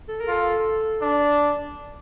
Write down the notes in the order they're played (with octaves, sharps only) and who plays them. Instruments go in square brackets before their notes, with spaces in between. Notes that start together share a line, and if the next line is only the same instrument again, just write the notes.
[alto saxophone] A4
A#4
[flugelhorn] F4 [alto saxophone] A4
[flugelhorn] D4